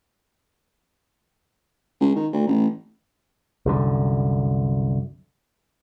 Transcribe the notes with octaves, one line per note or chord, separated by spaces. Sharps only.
C#2
D#3
D2
A1
C2 F#2 D3